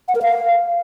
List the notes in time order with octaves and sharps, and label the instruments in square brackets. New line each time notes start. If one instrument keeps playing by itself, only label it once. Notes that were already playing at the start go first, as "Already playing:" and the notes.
[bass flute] F#5
A#4
F5